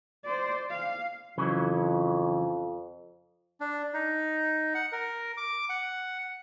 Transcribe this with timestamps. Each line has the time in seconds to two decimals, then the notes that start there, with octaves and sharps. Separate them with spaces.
0.24 C5 D5
0.70 F5
1.38 F2 C#3 E3 F#3
3.60 D4
3.94 D#4
4.75 F#5
4.92 A#4
5.37 D6
5.69 F#5